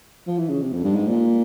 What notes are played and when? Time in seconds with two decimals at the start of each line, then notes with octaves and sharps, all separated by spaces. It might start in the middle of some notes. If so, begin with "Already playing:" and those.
0.27 F3
0.38 E3
0.49 C#3
0.61 C3
0.72 F2
0.84 G2
0.95 G#2
1.07 A#2